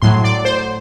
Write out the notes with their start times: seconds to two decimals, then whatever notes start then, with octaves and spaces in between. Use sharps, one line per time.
0.02 A2 F#3 C6
0.24 D5
0.45 C5